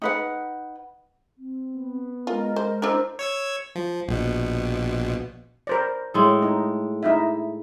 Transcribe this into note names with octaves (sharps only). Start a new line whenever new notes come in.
D#4 B4 F#5
C4
B3
G#3 F4 A#4
C5
D4 E4 A#4 C5 A#5 E6
C#5 E6 G#6
F3
A#1 B2
A#4 C5 D5
A2 G#3 A4
D#4
D#4 E4 E5